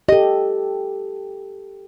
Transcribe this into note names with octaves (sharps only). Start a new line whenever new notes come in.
G4 A4 D#5